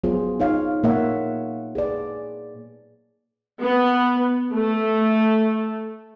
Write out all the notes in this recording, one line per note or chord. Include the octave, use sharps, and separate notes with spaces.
F#3 B3 F4 G#4 C5
D#4 C#5 F5
A#2 A#3 C#5 E5 F#5
G#4 B4 D5
B3
A3